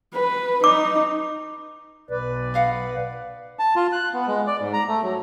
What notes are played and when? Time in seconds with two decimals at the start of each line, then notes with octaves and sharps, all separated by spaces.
0.14 B4
0.64 D#4 D6
2.10 B1 B4 D5
2.54 D#5 F5 F#5
3.59 A5
3.76 F4
3.92 F#6
4.13 B3
4.27 G#3
4.47 D5
4.61 G#2
4.73 A#5
4.88 A3
5.03 F#3